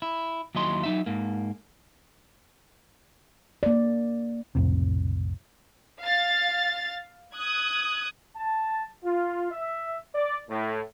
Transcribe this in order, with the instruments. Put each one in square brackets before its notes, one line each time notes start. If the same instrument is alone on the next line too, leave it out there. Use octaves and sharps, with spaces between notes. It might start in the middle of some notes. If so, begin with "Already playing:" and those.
[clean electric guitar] E4
D#2 F#3 E4 D#5 C6
F#3 D#4 E5
G#2 A#3
[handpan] A#3 D5
[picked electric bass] B1 F2 A2 C3
[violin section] F5 A6
D#6 F#6 G#6
[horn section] A5
F4
E5
D5
A2